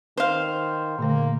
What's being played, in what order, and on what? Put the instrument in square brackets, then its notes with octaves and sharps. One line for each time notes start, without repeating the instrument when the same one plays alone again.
[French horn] D#3 [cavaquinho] C5 F5
[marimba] A#2 D3 A3 [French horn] A#3